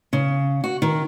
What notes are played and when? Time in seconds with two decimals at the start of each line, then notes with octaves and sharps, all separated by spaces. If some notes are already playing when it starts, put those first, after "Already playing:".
0.13 C#3
0.64 F#4
0.82 D#3